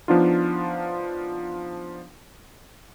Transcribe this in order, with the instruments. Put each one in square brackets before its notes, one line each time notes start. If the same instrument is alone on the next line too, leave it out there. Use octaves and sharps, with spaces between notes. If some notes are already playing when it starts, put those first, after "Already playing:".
[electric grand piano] F3 B3 D4 D#4 F4